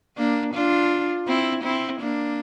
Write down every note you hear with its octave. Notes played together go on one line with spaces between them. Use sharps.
A#3 D4
D4 F4
C4 E4
C4 E4
A#3 D4